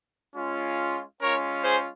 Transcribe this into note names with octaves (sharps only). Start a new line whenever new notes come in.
G#3 C#4 F4
G#3 C#4 F4 A#4 C#5
G#4 C5